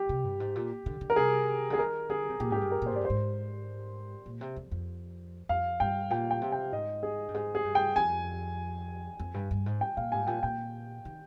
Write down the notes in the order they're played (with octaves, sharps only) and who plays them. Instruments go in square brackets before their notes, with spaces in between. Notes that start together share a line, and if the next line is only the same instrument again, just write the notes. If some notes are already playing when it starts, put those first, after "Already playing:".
Already playing: [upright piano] G4
[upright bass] C3
G2
G#2
A#2
D3
D3
[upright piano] A#4
[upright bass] C3 [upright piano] G#4
[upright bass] D3 [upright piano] G#4
[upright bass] D#3 [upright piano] A#4
[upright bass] D3 [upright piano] G#4
[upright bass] C3
[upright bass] A#2 [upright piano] G4
[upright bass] G#2 [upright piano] G4
[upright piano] G#4
[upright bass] G2
[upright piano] A#4
[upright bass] A#2 [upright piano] C5
[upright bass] G#2 [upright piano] D5
[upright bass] G2
[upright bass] G#2 [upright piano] C5
[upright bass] A#2
C3
F2
F2
[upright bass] F2 [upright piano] F5
[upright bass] G2 [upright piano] G5
[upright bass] A#2 [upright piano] G5
[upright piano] G5
[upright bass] C3
[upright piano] G5
[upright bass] G#2 [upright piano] D#5
[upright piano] G#4
[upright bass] G2
[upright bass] G#2 [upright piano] G#4
[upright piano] G#4
[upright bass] G2
[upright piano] G5
[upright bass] F2 [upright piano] G#5
[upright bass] F2
G2
G2
G#2
[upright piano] G5
[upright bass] A#2 [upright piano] F5
[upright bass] G#2 [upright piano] G#5
[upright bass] A#2 [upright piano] G5
[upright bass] A#2 [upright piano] G5
[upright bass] D#3